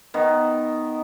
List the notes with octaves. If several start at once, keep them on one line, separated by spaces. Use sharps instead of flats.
D#3 B3